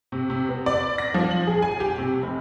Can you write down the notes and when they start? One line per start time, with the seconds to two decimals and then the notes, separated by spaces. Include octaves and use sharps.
0.12 C3
0.30 C3
0.49 B3
0.66 D5
0.98 A#6
1.14 F3
1.31 F#7
1.47 G#4
1.62 G#5
1.80 G4
1.98 C3
2.22 F1